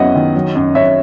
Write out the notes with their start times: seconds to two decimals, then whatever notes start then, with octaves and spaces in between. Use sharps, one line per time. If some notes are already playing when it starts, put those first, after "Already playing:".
Already playing: F#2 F#3 B3 D#5 E5 F#5
0.15 D#3
0.35 F#3
0.56 F#2
0.75 F#2 C#5 E5